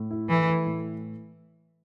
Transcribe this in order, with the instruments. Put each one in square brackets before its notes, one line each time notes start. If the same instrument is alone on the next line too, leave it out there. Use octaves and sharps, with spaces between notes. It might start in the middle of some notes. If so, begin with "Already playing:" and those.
Already playing: [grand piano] A2
E4
[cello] E3 [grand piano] A3
[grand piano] E4
A2